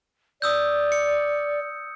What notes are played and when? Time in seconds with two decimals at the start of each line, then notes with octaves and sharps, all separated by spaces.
0.42 D5 D#6 E6 G6
0.92 C#7